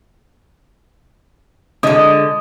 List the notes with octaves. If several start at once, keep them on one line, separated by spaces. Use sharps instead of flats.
D3 G#3 D#5